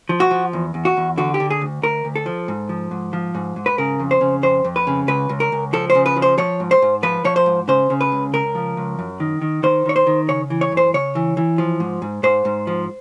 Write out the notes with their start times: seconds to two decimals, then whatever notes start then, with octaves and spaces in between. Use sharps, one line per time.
0.09 F3
0.20 F#4
0.31 F3
0.53 E2
0.74 E2
0.85 F#4
0.97 E2
1.18 D3 F#4
1.34 G4
1.40 D3
1.50 G#4
1.61 D2
1.82 D2 A#4
2.05 D2
2.16 A4
2.26 F3
2.48 G#2
2.69 F3
2.91 G#2
3.13 F3
3.35 G#2
3.56 G#2
3.66 B4
3.78 C#3 A#4
3.99 F2
4.11 C5
4.21 C#3
4.43 F2 C5
4.65 F2
4.76 B4
4.87 C#3
5.08 C#2 B4
5.29 C#2
5.40 A#4
5.52 C#2
5.73 F3 A4
5.90 C5
5.95 C#3
6.06 B4
6.16 F3
6.22 C5
6.38 F3 C#5
6.60 G#2
6.71 C5
6.82 G#2
7.03 F3 B4
7.24 F3 C#5
7.36 C5
7.46 G#2
7.68 C#3 C5
7.90 C#3
8.01 B4
8.12 C#2
8.33 C#2 A#4
8.55 F3
8.77 C#2
8.99 F#2
9.20 D#3
9.42 D#3
9.63 D#3 C5
9.86 D#3 C#5
9.96 C5
10.07 D#3
10.28 C#3 C#5
10.50 E3
10.61 C#5
10.72 F#2
10.77 C5
10.94 C#3 C#5
11.15 E3
11.37 E3
11.58 F3
11.80 G#2
12.02 G#2
12.23 G#2 C5
12.45 G#2
12.67 F3